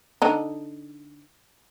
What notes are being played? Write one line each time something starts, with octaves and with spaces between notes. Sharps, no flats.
D3 D4 D#4